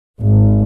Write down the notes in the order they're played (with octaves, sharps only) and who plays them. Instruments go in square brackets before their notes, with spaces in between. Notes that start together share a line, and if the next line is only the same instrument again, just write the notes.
[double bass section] G#1